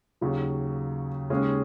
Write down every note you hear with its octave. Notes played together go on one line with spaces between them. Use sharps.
D#2 C#3 F#3
D#2 C#3 G#3 C#4 G#4